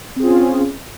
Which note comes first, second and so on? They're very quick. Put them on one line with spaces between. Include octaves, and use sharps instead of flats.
C4 G#4 F4 C#4